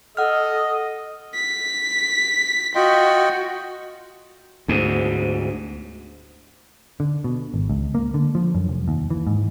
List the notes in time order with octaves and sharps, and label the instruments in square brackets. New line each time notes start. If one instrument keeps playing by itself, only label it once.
[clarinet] A4 [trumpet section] D#5 [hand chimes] F#5 F6
[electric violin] B6
[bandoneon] F4 D#5 G5 [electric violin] F#4
[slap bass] D2 G#2
[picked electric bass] D3
B2
G#1
C#2
A#3
D3
F3
F#2
F1
D#2
E3
G#2